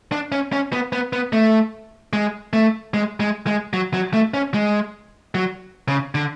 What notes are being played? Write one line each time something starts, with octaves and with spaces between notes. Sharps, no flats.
D4
C#4
C#4
B3
B3
B3
A3
G#3
A3
G#3
G#3
G#3
F#3
F#3
A3
C#4
G#3
F#3
C#3
D3